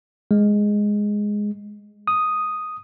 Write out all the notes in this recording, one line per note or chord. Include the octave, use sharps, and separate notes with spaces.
G#3
D#6